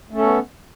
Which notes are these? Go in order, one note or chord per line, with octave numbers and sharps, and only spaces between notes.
A3 B3 C#4 A4